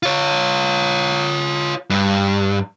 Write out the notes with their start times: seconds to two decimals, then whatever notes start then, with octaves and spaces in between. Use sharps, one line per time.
0.03 F4 C#5
1.90 G2